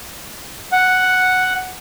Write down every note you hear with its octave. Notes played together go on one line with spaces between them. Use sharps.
F#5